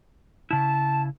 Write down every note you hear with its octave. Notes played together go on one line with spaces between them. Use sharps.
C#3 E4 A5